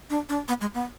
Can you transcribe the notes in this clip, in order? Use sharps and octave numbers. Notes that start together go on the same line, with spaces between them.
D4
D4
B3
G#3
B3